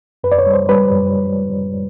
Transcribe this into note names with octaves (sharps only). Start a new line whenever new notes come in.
F#2 B4
D5
C#5
G3
C5
G3 B4
F#2